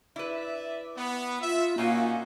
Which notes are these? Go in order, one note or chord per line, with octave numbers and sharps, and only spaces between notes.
E4 B4 D5 E5
B3
F4 E5
A#2 A#3 C#4 D#4 F#4 F5 G#5